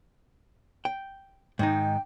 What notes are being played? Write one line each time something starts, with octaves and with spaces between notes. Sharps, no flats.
G5
G#2 D#3 D#4 G5